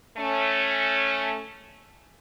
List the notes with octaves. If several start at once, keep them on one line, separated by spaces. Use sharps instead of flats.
A3 C#4